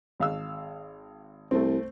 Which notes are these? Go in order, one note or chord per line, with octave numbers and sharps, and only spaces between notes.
G#1 F5 E6
C2 A3 C4